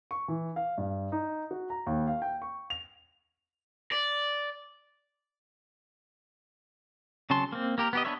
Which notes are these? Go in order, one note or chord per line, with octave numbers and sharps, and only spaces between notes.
C#6
E3
F5
G2
D#4
F#4
A#5
D#2
F5
G5
C#6
F7
D5
C#3 F#3 C#4 A5 C6
A#3 C4
A#3 G4 A#4
B3 G4 D#5
B3 D4 B4 C#5 E5